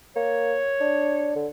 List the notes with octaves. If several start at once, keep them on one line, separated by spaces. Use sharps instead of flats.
A#3 C#5
D4
D3